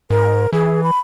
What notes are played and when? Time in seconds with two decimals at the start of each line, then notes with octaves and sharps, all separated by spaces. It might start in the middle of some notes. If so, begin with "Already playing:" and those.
0.10 G#2 A#4
0.53 E3 G#4
0.84 B5